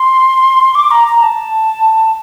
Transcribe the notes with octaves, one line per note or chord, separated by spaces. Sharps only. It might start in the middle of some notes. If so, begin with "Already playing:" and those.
Already playing: C6
D6
A#5
A#5
A5